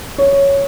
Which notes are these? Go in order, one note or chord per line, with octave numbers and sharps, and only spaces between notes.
C#5